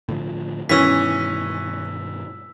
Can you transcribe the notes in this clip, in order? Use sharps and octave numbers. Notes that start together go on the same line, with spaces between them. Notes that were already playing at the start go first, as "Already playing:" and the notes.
A2 D3 F3
G2 B2 D#3 E3 C#4 E6 B6